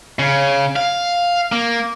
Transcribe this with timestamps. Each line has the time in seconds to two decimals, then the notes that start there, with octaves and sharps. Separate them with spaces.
0.19 C#3
0.76 F5
1.52 A#3